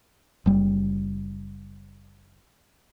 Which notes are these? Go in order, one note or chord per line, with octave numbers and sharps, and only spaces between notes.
F#1 G3